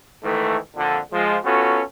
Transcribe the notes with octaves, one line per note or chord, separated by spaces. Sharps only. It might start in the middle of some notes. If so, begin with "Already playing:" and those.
G#2 D#3 E3 A3
F2 A#2 D3
F3 G#3
B3 C#4 F4 F#4 A4